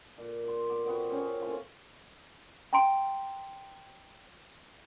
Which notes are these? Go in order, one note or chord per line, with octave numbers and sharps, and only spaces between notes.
A#2
D5 C6
B3 D6
A#2 B3 C4 F#4
C4 C#4 G#4 C#5
A2 A#3 F4 G#5
G5 A#5 C6 D7